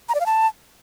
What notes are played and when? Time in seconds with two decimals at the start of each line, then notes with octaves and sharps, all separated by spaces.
0.09 A#5
0.15 D5
0.20 F5
0.26 A5